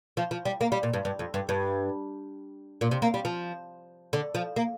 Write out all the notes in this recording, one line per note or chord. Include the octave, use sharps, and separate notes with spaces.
F3
F3
G3
A#3
G3
A#2
G2
G2
F2
G2
G2
A#2
C3
A#3
G3
F3
D3
F3
A#3